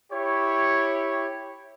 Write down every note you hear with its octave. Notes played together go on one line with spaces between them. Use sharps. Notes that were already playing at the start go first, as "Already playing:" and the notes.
E4 G4 C#5